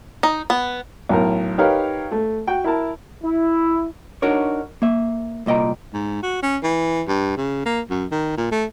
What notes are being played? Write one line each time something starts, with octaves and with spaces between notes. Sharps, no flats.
D#4
B3
B1 A2 A#4
D#4 G4 A#4 B4 C#5 F5
A3
F#4 G5
E4 A#4 A5
E4
D4 D#4 F#4 A#4 C#5
A#3 E5
C2 A#2 D#5 G5 A#5
G#2
F#4
C#4
E3
G2
C#3
A#3
F#2
D#3
A#2
A3